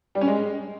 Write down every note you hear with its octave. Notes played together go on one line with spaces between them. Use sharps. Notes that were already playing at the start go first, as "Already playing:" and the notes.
G3
C#4
G#3